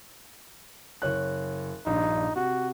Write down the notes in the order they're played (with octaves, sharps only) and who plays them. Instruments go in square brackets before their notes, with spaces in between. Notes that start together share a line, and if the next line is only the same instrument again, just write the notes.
[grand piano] F#1 C#5 F#6
[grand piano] A#1 G2 [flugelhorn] D#4
[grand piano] C3 [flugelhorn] F#4